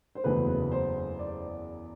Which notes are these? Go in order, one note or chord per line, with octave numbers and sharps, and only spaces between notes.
C5
F#1 E2 C#3 F#3 A3 B4
C5
D5